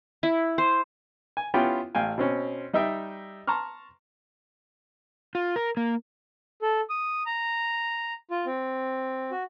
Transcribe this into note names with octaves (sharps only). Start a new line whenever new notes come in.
E4
C5
G#5
B3 C#4 E4 F4 G4 G5
A1 F5 G5 G#5
B2 C4 C#4
G3 D#4 D#5 E5 G5
A5 A#5 C6 C#6 F6
F4
A#4
A#3
A4
D#6
A#5
F4
C4
F#4